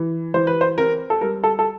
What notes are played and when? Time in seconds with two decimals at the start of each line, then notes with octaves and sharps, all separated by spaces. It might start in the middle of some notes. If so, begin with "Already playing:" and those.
Already playing: E3
0.34 E3 C5
0.47 B4
0.61 C5
0.78 C4 A#4
1.10 A4
1.21 G3 A#4
1.44 A4
1.59 A4